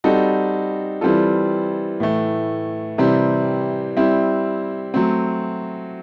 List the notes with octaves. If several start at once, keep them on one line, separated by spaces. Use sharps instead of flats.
G3 C4 D#4 F#4 A4
E3 G3 C4 F4 A4
A2 E3 A3
C3 E3 G3 C4
G3 C4 E4
F#3 A3 C4